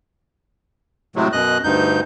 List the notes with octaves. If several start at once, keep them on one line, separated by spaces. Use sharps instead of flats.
A2 C3 F#3 G#3 A3
F#2 B2 D#5 F#6
D2 G2 D#4 G6